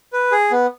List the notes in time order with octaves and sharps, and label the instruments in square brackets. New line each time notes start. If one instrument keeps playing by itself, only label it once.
[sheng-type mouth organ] B4
G#4
B3